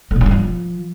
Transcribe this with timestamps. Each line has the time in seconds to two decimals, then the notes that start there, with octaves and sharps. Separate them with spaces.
0.11 A3
0.16 A#2
0.21 G3
0.26 F#3
0.31 F3